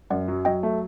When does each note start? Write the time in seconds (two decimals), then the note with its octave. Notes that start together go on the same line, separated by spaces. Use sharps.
0.10 F#2 D5 F#5
0.28 F#3
0.45 F#3 D#5 G5
0.63 A3